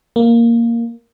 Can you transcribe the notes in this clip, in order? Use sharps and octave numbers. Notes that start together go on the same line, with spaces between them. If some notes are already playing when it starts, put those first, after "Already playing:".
A#3